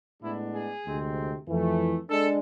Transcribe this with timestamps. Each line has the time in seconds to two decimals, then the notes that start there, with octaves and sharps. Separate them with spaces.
0.22 A2 G#3 B3 D4 E4
0.53 G#4
0.85 D2 C3 G#3 C4
1.47 F2 E3 A3 E4
2.10 G#3 D4 A4